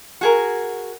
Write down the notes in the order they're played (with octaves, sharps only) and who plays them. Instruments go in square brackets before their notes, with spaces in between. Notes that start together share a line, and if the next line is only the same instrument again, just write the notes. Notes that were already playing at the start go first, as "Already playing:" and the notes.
[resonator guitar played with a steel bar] F#4 G#4 A#4